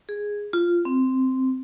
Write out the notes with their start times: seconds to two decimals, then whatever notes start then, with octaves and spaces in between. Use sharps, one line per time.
0.09 G#4
0.53 F4
0.85 C4